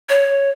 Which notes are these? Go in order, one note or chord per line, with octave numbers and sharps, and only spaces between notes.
C#5